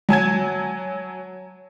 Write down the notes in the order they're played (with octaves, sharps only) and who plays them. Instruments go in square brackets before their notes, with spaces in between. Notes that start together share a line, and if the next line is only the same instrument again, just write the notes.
[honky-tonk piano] F#3 G#5 A5 G#6